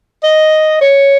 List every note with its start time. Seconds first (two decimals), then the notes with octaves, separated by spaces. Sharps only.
0.23 D#5
0.81 C#5